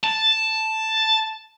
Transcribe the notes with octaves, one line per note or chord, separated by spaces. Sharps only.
A5